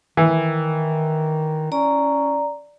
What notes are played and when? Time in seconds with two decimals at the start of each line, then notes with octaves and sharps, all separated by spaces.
0.17 D#3 E3
1.72 C#4 D5 A#5